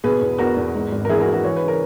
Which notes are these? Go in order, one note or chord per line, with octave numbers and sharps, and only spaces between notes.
B2 G#4 B4
E2
E2 F#4 A#4
E2
G#2
G#1
A#4
E3 E4 G#4
F#4 A#4
E3
F#4 A#4
E3 C#5
B4
C#3
A#4